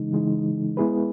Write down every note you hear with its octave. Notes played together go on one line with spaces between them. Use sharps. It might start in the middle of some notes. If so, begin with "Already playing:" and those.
Already playing: C#3 E3 G#3 D#4
C#3 E3 G#3 D#4
G#3 B3 E4 G#4 B4